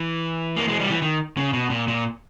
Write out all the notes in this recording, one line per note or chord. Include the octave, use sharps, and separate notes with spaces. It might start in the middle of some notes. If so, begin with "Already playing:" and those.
Already playing: E3
A#3
G#3
G3
E3
D#3
C#3
B2
A#2
A#2